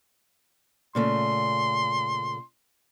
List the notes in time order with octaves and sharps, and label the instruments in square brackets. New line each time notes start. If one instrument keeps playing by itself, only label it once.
[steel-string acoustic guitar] A#2 C#3 A3 [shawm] C6